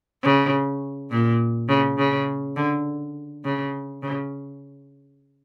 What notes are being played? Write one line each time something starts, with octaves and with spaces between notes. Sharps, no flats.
C#3
A#2
C#3
C#3
D3
C#3
C#3